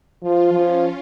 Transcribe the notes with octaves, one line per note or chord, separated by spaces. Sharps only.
F3 F4
F3 C#4